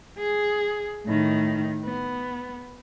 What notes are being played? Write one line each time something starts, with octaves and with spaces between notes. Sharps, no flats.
G#4
A2 D#3
B3